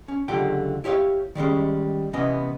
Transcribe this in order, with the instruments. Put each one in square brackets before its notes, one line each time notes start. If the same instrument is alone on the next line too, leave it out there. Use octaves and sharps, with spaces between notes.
[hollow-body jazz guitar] C#4
C#2 D3 F#3 F4 G4 G5
E4 G4 C#5 D#5 F5
D#3 G3 G#3 C#4
C3 E3 B3 C#4 D#5